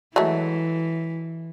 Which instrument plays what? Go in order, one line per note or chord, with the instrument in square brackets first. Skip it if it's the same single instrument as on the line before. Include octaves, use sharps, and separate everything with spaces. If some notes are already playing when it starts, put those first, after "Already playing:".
[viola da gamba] E3 [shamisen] F#3 G#3 A3